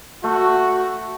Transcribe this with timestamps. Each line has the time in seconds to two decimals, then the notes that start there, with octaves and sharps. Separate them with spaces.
0.24 A3 F#4